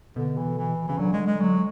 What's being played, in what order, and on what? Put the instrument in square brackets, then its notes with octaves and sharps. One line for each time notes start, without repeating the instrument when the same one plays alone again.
[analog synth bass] B2 [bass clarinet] D3
[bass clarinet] E3
E3
[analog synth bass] C#3 [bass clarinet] E3
[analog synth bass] D3 [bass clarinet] F#3
[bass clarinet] G#3
G#3
F#3